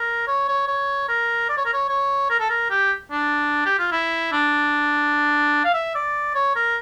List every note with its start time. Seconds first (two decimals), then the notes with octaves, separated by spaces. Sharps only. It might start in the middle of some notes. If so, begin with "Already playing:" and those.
Already playing: A#4
0.27 C#5
0.48 C#5
0.68 C#5
1.09 A#4
1.49 D5
1.57 C#5
1.65 A#4
1.73 C#5
1.89 C#5
2.30 A#4
2.40 A4
2.50 A#4
2.71 G4
3.11 D4
3.66 G4
3.79 F4
3.92 E4
4.33 D4
5.65 F5
5.74 E5
5.95 D5
6.35 C#5
6.56 A#4